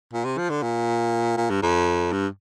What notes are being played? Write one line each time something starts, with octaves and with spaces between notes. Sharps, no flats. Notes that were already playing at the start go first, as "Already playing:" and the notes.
A#2
C3
F3
D3
A#2
A#2
G2
F2
G2